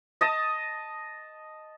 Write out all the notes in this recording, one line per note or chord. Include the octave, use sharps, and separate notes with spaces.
D#5 A5 D#6